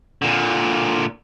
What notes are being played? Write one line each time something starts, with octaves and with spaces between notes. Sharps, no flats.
A#2 D3